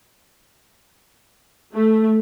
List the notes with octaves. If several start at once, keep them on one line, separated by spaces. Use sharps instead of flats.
A3